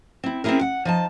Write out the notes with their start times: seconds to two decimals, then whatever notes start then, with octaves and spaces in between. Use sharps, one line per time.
0.24 C4 E4
0.44 C4 C#4 D#4 E4 G#4 A#4
0.61 F#5
0.85 F3 D#4 A5